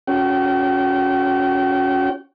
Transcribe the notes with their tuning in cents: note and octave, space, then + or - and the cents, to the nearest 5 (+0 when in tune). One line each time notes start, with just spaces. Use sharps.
C#4 +10 F#4 -25 G5 -35